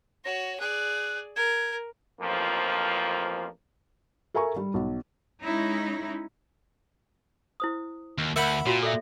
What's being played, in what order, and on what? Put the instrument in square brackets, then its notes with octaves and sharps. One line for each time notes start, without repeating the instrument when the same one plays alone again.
[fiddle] F#4 C#5 [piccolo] A#6
[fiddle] G#4 D5 [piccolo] F#6
[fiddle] A#4 [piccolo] G#6
[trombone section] A1 F2 F3 A#3
[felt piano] A4 A#4 E5 G#5 A#5 C#6
G3
B1
[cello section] G#3 C#4 D#4 E4
[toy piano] E4 C5 D#6
[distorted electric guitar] D#2
[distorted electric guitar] D2 [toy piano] A#4 [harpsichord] E5 F#5 B5
[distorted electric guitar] A#2 [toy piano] F4 F#4 C#5
[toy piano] A4 D5 E5